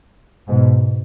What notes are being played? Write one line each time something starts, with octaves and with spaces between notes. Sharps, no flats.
G#2 B2